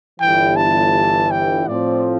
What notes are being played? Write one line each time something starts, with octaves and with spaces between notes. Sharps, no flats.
G1 G2 E3 G5
A5
G5
A2 F3 C4 D5